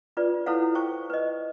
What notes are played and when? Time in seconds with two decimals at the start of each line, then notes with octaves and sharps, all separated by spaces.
0.17 D4 F4 B4 D5
0.46 E4 A4 B4 C#5 F5 F#5
0.75 C5 G5 C#6
1.10 B4 D#5